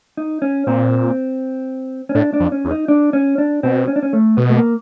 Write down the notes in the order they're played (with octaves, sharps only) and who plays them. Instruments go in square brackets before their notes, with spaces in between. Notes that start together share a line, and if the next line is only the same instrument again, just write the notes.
[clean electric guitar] D#4
C#4
[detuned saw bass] A#2 [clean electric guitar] C4
[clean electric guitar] C#4
[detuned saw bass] A2 [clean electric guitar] D4
[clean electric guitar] D4
[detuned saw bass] F2
[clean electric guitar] C#4
[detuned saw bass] E2
[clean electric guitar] D#4
D4
C#4
D4
[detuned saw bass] B2 [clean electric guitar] C4
[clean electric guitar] C#4
D4
C#4
A3
[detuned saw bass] B2 [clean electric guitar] B3
[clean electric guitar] A3
A#3